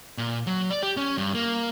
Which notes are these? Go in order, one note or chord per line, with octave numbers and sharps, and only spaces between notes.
A#2
F#3
D5
G4
C#4
G2
A#3